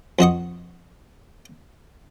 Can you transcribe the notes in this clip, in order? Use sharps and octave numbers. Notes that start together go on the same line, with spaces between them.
F2 F#4 D#5 C#6